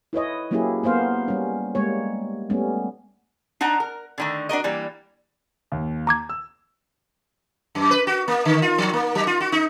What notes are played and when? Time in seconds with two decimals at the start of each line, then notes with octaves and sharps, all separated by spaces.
0.13 E4 B4 C#5 D#5
0.51 F#3 A#3 C#4 E4 G4 G#4
0.83 A#3 B3 C5 F5
1.28 G3 C#4
1.75 G3 G#3 A#3 C#5
2.50 G3 A3 B3 C#4
3.61 D4 D#4 F#5 A5 A#5
3.80 A#4
4.18 D3 D#3 A3
4.49 D4 F#4 A#4 D#5
4.64 E3 G3 A#3
5.72 D#2
6.07 A#5 D6 G#6
6.29 E6
7.75 F#2
7.91 B4
8.07 F#4
8.28 A#3
8.45 D3
8.62 F4
8.78 F3
8.93 A#3
9.15 F#3
9.27 F4
9.40 F#4
9.52 D#4